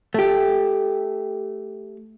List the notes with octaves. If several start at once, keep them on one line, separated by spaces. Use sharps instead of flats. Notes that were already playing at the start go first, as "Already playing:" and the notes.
A3 G4